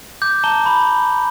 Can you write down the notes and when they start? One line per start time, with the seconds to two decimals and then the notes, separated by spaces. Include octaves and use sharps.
0.22 D6 G6
0.44 A5 A#5 G7
0.66 B5